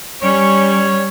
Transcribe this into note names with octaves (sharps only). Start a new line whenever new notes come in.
G3 C#4 C#5